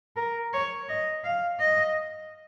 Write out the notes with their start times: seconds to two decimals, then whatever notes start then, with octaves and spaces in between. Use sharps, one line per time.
0.16 A#4
0.53 C#5
0.88 D#5
1.24 F5
1.60 D#5